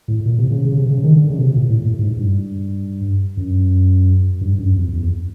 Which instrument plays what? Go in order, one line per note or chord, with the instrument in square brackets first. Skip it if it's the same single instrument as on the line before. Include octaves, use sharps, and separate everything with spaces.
[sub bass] A2
A#2
C3
C#3
C#3
C3
C#3
D#3
D3
C#3
B2
C3
A#2
A2
A2
G#2
G2
F#2
G2
F#2
F2
E2